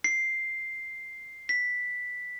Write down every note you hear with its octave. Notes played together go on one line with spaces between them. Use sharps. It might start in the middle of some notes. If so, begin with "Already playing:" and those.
C7
B6